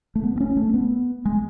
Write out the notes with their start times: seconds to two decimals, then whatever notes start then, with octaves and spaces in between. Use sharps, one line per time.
0.15 A3
0.23 B3
0.36 B3
0.40 C#4
0.57 A3
0.74 B3
1.25 G#3